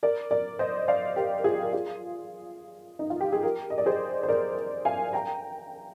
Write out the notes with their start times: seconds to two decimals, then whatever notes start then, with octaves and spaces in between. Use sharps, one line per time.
0.03 A#4 D5
0.31 A#4 D5
0.59 C5 D#5
0.88 D5 F5
1.16 G4 A#4
1.39 A#4
1.44 F4 G#4
1.62 A#4
1.73 F4 G#4
2.99 D#4
3.10 F4
3.21 G4
3.32 G#4
3.43 G4 A#4
3.70 D#5
3.78 D5
3.86 G#4 C5
4.23 C5
4.28 A#4 D5
4.85 F5 G#5
5.13 G5 A#5